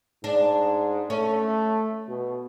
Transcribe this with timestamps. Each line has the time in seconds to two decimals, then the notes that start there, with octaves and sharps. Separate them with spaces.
0.24 G#2 D4
1.10 A3 C#4
2.08 B2